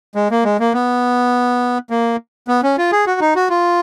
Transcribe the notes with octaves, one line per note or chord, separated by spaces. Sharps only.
G#3
A#3
G#3
A#3
B3
A#3
B3
C#4
F4
G#4
F#4
D#4
F#4
F4